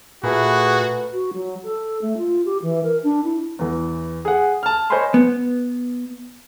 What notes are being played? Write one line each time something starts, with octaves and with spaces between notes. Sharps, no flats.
A#2 A3 F#4 G#4 A#4 B4
F#4
F#3
A4
A3
F4
G4
E3
A#4
D4
E4
E2 E3
G#4 F#5
A5 F6
C5 C#5 D#5 G#5 B5 C6
B3